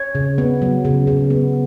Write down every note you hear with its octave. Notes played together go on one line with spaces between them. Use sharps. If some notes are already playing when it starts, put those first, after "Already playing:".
Already playing: C#5
C#3
B3
F#3
C#3
C#3
B3